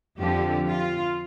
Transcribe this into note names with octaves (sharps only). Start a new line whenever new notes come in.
F2 D3 F3 G4
F4